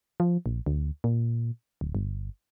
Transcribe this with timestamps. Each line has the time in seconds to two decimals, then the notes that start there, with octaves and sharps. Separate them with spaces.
0.20 F3
0.46 A#1
0.66 D2
1.04 A#2
1.81 D1
1.95 G1